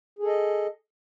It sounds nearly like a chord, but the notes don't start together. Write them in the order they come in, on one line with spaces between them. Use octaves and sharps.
G#4 A4 D#5